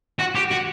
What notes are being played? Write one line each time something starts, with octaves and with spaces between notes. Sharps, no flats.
F#4
G4
F#4